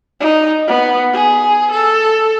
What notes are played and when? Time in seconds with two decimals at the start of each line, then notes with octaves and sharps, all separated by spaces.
0.20 D#4
0.67 B3
1.13 G#4
1.72 A4